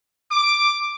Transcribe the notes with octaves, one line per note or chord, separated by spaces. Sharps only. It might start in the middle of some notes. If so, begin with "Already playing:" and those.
D6